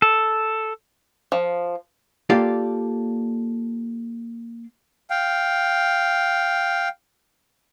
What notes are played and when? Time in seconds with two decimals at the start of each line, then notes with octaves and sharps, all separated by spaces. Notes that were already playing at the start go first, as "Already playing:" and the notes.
0.02 A4
1.32 F3
2.30 A#3 F4 G4 A4 D5 F5
5.10 F5 G5